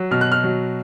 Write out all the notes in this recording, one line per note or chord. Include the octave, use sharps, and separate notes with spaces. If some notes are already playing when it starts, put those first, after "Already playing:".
Already playing: F#3
B2 F6
F#6
F6
F#3